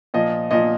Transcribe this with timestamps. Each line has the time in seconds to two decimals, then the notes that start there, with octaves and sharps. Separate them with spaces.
0.14 A#2 F3 D#5
0.51 A#2 F3 D#5